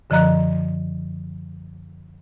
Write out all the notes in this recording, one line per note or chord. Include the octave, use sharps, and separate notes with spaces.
F#2 D3 F3 D#5 A#5 F#6